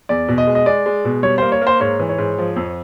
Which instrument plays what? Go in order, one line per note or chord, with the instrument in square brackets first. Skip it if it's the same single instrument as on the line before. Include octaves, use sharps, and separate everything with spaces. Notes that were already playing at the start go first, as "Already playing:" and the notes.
[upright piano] E2 [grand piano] D5
[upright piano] B2
[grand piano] D#5
[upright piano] G#3
[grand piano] D#5
[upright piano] G#3 [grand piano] D5
[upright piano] G#3
B2
[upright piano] G3 [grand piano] C#5
[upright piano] A#3 [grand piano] C5
[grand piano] C#5
[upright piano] A#3
[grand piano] C5
[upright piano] G#2 [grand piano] C#5
[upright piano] E3
[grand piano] C#5
[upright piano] G#2
F3
F2